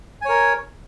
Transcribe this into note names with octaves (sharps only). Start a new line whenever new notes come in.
A#4 C#5 G#5